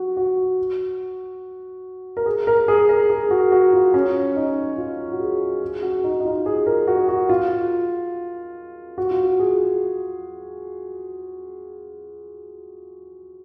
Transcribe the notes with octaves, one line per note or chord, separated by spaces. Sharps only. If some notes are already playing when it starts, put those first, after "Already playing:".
Already playing: F#4
F#4
A#4
G#4
A#4
G#4
A#4
G#4
F#4
F#4
F4
C#4
D#4
F4
F#4
G#4
G#4
F#4
D#4
D#4
F4
G#4
A#4
F#4
F#4
F4
F#4
F4
F#4
G#4